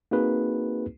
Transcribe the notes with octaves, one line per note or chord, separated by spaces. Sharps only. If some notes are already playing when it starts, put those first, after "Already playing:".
A#3 C4 D#4 F#4 G#4 B4